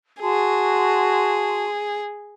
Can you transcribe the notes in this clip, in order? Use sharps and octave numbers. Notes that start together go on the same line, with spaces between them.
F#4 G#4 A5 C6